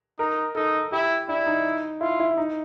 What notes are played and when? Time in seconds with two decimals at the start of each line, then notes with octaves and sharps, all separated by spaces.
0.19 D#4 A#4
0.55 D#4 A4
0.92 E4 G4
1.28 D4 E4
1.46 D#4
2.01 E4 F4
2.20 E4
2.37 D#4